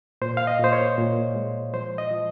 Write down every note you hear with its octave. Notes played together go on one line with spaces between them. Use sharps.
A#2 C5
F5
D#5
A#2 C5
C#5
A#2
G#3
F3 C5
D#5
F3